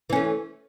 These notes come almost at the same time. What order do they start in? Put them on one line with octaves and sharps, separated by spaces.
E3 C#4 A3